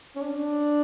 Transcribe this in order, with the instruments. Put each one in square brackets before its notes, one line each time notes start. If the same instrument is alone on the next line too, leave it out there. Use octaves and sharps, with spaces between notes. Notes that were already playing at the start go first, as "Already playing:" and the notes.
[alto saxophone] C#4
D4